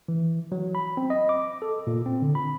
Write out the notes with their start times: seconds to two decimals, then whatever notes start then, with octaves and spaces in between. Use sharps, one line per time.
0.08 E3
0.52 F#3
0.75 B5
0.97 C4
1.10 D#5
1.29 D6
1.62 A4
1.87 A#2
2.06 C4
2.22 D3
2.35 B5